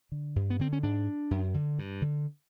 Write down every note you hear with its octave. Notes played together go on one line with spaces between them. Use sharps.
D3
G2
B3
D3 C4
C#4
G#2 D4
F#2
D3
G2
D3